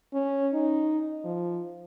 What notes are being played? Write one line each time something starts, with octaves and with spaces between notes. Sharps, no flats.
C#4
D#4
F3